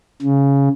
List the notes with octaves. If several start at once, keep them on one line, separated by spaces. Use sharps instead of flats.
C#3